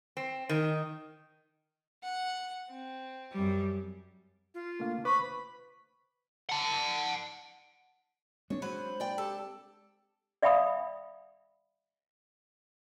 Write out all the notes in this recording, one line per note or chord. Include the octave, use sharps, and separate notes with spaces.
C4
D#3
F#5
C4
F#2 G3
F4
A3 A#3 D4 F5
B4 C5 B5 C#6 D6
F#5 A5
G#3 C4 D4 C#5
F#3 B4 C5
D5 G5
G4 A4
D5 E5 F5 G5 B5 D#6